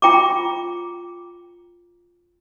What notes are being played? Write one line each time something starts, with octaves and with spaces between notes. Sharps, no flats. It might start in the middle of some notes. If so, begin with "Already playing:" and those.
F4 G5 A#5 D6